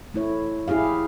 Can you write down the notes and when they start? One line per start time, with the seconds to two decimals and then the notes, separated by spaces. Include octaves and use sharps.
0.14 A3 E4 C#5
0.68 E4 G4 G#4 F5